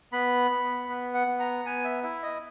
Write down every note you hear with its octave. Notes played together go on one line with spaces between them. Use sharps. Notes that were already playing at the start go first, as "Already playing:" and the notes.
B3 B5
B3
B3
F#5
B3
A#5
B3 G#5
E5
E4 E5
D#5